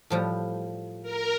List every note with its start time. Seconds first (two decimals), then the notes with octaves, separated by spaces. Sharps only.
0.10 A2 F3 G3
1.03 A#4